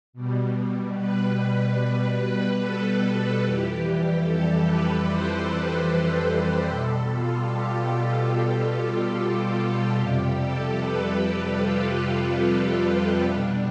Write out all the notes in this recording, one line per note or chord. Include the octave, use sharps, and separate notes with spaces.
B2 G3
B4
B4
A4
F2 E3 G3 G4
A4
B4
C5
C5
C5
B4
B2 G3 A4
F4
G4
F4
G4
F4
F2 C3 G3 G4
A4
B4
B4
F4
B2 G3 D4